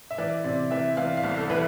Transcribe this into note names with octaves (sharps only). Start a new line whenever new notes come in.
E5
E3 D5
C3 D5
E3 E5
E3 F5
F5
C2
A4
E3 B4